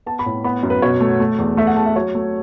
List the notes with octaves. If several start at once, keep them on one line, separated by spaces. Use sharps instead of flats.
B3 A5
B5
A2
B3 B5
F#2
B4
B2 C#5
A3
A3
E2
A3 E5
F#5
E2 A5
E5
F#3 C#5
A3